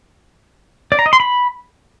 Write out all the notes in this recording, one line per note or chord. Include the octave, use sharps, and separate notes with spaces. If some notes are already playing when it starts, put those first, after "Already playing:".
D5
A#5
D#5
C6
B5